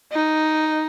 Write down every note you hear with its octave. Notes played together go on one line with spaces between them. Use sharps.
D#4